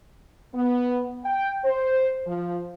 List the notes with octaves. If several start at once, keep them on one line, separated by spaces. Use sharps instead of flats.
B3
G5
C5
F3